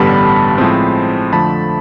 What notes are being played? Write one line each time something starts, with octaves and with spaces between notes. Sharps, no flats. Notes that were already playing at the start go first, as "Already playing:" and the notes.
Already playing: A1 G2 D3 G3 B3 A5 B5
A2 F3 G#3 C4
F2 D3 F3 A3 A5 B5